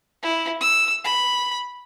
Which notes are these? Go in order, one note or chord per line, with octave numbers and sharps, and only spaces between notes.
E4
E6
B5